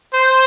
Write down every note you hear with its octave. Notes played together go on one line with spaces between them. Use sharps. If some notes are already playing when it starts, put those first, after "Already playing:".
C5